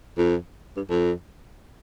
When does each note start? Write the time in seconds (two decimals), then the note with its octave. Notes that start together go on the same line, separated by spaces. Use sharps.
0.18 F2
0.76 G2
0.90 F2